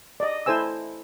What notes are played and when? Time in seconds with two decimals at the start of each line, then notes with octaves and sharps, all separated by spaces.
0.20 D5 D#5
0.46 E4 A4 C5 G#5 E6